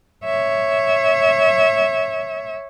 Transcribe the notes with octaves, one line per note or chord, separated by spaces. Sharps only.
C#5 E5